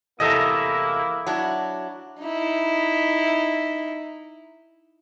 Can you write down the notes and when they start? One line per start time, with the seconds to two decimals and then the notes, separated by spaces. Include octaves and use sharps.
0.20 E2 C3 A3 A#3 E4 D#5 E5 A#5
1.27 F#3 D4 E4
2.23 D#4 E4